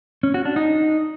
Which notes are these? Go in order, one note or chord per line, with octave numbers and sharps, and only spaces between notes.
C#4
F#4
D4
D#4